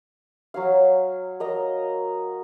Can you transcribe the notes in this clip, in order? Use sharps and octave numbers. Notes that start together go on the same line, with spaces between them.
F#3 F#4 C#5 F5
A#4 D#5 A#5